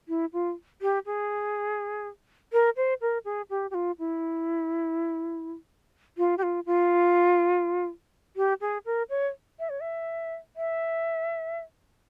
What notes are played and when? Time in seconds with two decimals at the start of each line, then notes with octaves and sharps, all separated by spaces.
0.08 E4
0.33 F4
0.82 G4
1.06 G#4
2.52 A#4
2.77 C5
3.01 A#4
3.25 G#4
3.50 G4
3.71 G4
3.74 F4
3.99 E4
6.18 F4
6.38 G4
6.43 F4
6.66 F4
8.36 G4
8.61 G#4
8.86 A#4
9.10 C#5
9.59 E5
9.69 C#5
9.81 E5
10.56 E5